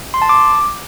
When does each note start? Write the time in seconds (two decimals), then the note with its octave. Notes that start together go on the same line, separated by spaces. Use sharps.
0.14 C6
0.22 A5
0.29 D6